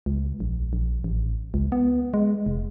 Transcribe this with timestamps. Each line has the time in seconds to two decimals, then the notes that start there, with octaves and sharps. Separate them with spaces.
0.06 C#2
0.40 A#1
0.73 A#1
1.04 A1
1.54 C#2
1.72 B3
2.14 G#3
2.46 F1